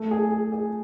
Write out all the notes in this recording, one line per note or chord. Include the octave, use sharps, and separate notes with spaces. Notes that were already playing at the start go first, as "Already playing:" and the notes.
Already playing: A3
G#4
G#4
G#4